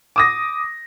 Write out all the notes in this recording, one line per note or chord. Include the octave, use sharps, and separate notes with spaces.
D6 D#6 A#6